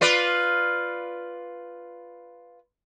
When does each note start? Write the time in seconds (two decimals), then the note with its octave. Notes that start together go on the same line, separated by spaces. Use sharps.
0.01 F4 B4 D5